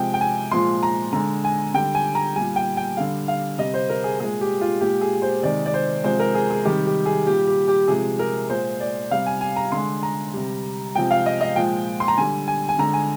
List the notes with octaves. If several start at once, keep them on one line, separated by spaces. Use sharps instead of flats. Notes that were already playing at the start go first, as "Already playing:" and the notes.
Already playing: C3 F3 G#3 G5
G5
G#5
A#2 F3 G#3 C6
A#5
D3 G#3 A#5
G#5
D3 G3 G5
G#5
A#5
A#2 G3 G#5
G5
G5
D3 G3 F5
F5
C3 G3 D#5
C5
A#4
G#4
A#2 G#3 G#4
G4
F4
A#2 G#3 G4
G#4
C5
C3 D#3 G#3 D5
D5
C5
C3 F3 G#3 C5
A#4
G#4
G#4
C3 D#3 G3 G4
G4
G#4
A#2 G3 G4
G4
G4
C3 F3 G#3 G#4
A#4
A#2 G#3 C5
D5
C3 G3 F5
G#5
G#5
A#5
D3 G#3 C6
A#5
C3 G3
C3 F3 G#3 G5
F5
D#5
D#5
A#2 F3 G#3 G5
C6
A#5
D3 G3 G#5
G#5
G#5
D3 G#3 A#5
G#5